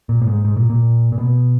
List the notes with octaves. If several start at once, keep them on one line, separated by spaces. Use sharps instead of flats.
A#2
A2
G#2
G#2
A#2
A#2
A#2
B2